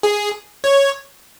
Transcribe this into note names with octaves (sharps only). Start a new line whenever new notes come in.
G#4
C#5